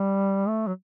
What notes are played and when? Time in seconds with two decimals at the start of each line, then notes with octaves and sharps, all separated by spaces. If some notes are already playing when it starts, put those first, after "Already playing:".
Already playing: G3
0.48 A3
0.67 F#3